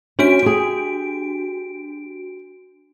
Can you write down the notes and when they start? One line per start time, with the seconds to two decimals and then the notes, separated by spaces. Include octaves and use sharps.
0.19 C#4 D4 F#4 D7
0.43 G4 G#4